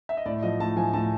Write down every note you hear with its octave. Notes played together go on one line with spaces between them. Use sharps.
E5
D#5
A2 D5
F3 D#5
A2 A5
F3 G#5
A2 A5